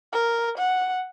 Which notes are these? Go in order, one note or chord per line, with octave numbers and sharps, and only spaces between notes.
A#4
F#5